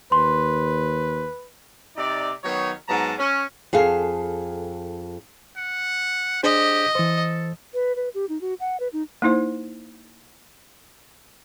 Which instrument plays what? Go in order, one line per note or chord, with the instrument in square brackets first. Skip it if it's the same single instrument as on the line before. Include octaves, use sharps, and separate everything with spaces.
[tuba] D#2 [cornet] B4 [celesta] C6
[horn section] C3 D#4 D5
D#3 F#3 B3 D#4 C#5
G#2 F#3 B3 A5 A#5
C#4
[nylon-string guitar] F2 G#4 A4 F5
[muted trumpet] F#5
[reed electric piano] D4 G#4 C5 [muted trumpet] G4 [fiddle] D#5
[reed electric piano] E3 C5 [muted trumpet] A4
[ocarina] B4
B4
G4
D#4
F#4
F#5
B4
D#4
[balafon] A#3 D#4 E4 C5